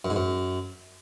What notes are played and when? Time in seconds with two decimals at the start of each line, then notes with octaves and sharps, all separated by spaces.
0.05 F#2
0.10 G#2
0.16 F#2